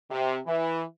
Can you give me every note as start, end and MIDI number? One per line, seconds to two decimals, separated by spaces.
0.10 0.38 48
0.46 0.83 52